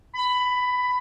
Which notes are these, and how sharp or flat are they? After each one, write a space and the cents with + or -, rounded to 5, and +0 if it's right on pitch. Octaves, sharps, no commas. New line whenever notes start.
B5 +15